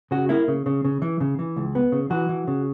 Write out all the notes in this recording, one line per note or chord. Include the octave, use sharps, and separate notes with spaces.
C#3 F#4
A#3 E4
C#3
C#3
C#3
E3
C#3
E3
C#2
B3
C#3
E3 F#4
E3
C#3